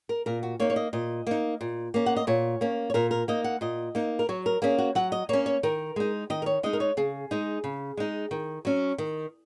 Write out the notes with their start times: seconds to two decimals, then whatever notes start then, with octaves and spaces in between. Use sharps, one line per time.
0.09 A#4
0.26 A#2 A#4
0.43 F#4
0.60 A#3 D#4 C#5
0.70 C#5
0.76 D#5
0.93 A#2 D#5
1.27 A#3 D#4
1.61 A#2
1.94 A#3 C#4
2.06 F#5
2.16 D#5
2.27 A#2 C#5
2.61 A#3 C#4
2.90 C#5
2.94 A#2 A#4
3.11 A#4
3.28 A#3 D#4 D#5
3.44 F#5
3.61 A#2 D#5
3.95 A#3 D#4
4.19 A#4
4.29 F#3 C#5
4.46 A#4
4.62 A#3 C#4 G#4
4.79 F#4
4.95 F#3 F#5
5.12 D#5
5.29 A#3 C#4 C#5
5.46 C#5
5.63 D#3 A#4
5.96 G#3 D#4
6.30 D#3 D#5
6.42 A#4
6.46 C#5
6.63 G#3 D#4 D#5
6.73 A#4
6.80 C#5
6.97 C#3 G#4
7.31 G#3 D#4
7.64 C#3
7.97 G#3 D#4
8.31 D#3
8.65 F#3 C#4
8.98 D#3